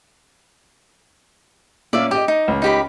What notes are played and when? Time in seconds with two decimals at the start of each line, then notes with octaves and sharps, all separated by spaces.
1.93 A#2 C#4 D5 E5 F5
2.11 G4 D#5 D6
2.28 D#4
2.48 C#2
2.62 D#4 G4 B5